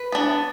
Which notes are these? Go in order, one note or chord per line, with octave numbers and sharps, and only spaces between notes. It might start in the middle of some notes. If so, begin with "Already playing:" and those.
Already playing: B4
B3 D4